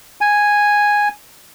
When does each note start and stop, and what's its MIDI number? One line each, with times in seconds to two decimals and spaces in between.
0.21 1.08 80